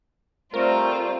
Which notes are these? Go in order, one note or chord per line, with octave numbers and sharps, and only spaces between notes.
G3 A3 C4 F4 A#4 C5